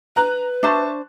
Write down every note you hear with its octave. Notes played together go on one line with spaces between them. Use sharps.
B4 A#5 F#6
D4 C5 E5 A5 C#6